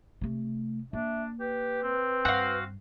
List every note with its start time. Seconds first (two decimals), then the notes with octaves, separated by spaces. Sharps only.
0.21 C3 A3
0.93 A#3 D4 E5
1.40 G4 B4
1.83 C4
2.25 G2 F#4 F5